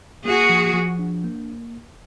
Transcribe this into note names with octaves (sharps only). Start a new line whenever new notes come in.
A#3 F#4 G#4
F3
F3
D4
A#3